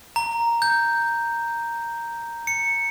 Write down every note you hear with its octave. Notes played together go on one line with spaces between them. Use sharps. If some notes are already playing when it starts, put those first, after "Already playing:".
A#5
G6
C#7